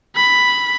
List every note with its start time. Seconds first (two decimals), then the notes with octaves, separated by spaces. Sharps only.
0.16 B5